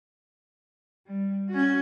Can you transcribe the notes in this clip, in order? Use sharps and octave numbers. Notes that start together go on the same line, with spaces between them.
G3
C#4 F#4